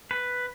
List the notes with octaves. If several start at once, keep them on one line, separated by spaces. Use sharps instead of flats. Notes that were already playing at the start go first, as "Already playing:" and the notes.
B4